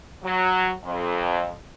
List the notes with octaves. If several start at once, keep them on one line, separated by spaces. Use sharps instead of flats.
F#3
F2